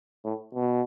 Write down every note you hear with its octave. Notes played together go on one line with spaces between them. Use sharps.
A2
B2